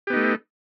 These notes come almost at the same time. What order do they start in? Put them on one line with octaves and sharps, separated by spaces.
G4 B3 D#4 A3